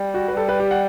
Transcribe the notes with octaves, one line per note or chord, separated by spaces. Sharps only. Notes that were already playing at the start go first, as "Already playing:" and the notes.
Already playing: G3
F#4
B4
G3 A4
B4
G4
F#5